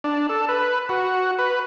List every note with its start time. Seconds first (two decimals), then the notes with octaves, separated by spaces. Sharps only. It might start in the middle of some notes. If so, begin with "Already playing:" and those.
0.04 D4
0.29 A4
0.49 B4
0.89 F#4
1.39 B4